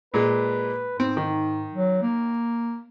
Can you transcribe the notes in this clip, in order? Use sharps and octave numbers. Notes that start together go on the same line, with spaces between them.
A#2 G#3 B4
G#2 C4
D#3
F#3
A#3